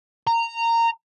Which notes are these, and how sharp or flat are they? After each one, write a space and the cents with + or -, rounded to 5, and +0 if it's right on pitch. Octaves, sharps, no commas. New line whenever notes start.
A#5 -15